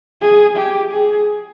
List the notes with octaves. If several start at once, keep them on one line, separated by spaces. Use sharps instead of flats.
G#4
G4
G#4